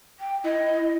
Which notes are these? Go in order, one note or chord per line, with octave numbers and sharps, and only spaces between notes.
G5
E4 D#5